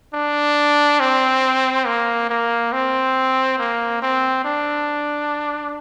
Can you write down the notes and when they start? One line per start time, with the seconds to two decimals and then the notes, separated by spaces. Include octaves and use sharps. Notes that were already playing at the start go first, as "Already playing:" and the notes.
0.14 D4
1.00 C4
1.86 A#3
2.30 A#3
2.72 C4
3.59 A#3
4.02 C4
4.45 D4